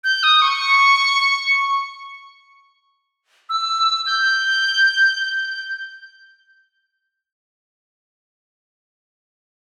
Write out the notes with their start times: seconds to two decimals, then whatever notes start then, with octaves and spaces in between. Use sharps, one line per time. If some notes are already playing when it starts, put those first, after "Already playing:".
0.04 G6
0.23 D#6
0.42 C#6
3.49 E6
4.07 G6